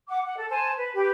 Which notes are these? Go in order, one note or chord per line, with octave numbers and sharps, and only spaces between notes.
F#5 D6
F#5
A4
C5 G#5 A5
B4
G4 B4